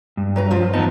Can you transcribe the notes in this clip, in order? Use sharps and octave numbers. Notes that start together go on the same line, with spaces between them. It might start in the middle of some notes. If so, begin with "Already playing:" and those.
G2
F#3 B4 A#5
F3 C4 F4
E2 B3 D#4 A5